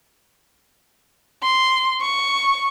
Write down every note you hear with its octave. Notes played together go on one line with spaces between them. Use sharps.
C6
C#6